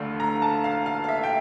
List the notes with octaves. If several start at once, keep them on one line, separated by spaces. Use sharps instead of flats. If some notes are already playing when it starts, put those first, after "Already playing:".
Already playing: D2 D3 A3 F5
A#5
A5
F5
F5
F5
E5
G5